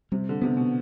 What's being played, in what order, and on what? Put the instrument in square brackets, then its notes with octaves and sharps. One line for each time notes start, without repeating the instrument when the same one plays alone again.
[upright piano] C3 [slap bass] G3
[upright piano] D3
[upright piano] C3 [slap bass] B3
[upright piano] B2